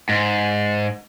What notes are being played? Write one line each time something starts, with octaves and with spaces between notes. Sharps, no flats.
G#2